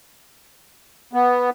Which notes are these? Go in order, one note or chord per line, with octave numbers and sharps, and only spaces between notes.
B3